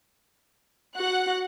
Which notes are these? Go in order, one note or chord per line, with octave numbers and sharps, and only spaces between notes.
F#4 F#5 F#6